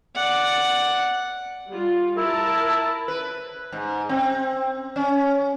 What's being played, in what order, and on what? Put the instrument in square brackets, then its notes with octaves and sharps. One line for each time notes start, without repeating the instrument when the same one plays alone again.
[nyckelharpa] D5 F#5
[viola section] G3 F4
[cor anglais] E4 [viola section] A#4 A5
[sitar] B4
G#2
C4
C#4